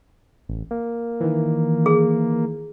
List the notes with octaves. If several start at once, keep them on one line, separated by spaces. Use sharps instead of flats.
A1
A#3
D#3 E3
G#4